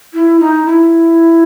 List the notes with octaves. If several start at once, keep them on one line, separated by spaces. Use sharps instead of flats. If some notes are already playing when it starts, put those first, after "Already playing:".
E4
D#4
E4